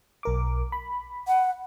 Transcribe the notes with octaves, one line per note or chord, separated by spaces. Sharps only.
B1 A#4 D6
B5
F#5